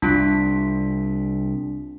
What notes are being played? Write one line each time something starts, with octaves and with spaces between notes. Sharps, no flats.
C2 D4 F4 B6